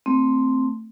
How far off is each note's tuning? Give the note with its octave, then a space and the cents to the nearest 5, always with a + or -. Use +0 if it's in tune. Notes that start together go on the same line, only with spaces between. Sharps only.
A3 +20 C4 +0